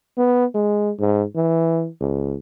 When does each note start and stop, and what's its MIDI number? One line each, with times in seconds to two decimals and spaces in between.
0.17 0.45 59
0.54 0.91 56
0.99 1.23 44
1.36 1.88 52
2.01 2.36 37